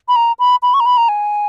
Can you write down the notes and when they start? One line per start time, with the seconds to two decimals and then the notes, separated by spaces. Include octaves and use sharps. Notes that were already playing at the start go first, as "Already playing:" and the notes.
0.08 B5
0.16 A#5
0.39 B5
0.63 B5
0.74 C#6
0.80 A#5
0.86 B5
0.97 A#5
1.09 G#5